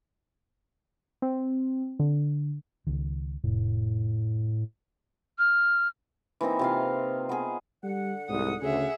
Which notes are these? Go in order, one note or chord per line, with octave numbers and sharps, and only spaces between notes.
C4
D3
C#2 D#3
F1 A2
F6
E3 A#3 C4 D#4
C3 F4 F5
B3 G#4
D3 G3 F#5
C2 G#2 D#6
D2 C#3 G#4 E5